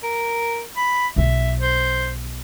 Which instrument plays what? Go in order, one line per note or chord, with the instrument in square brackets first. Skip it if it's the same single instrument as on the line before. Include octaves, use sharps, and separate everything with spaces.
[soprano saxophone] A#4
B5
[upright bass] B1 E4 [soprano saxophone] E5
[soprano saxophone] C5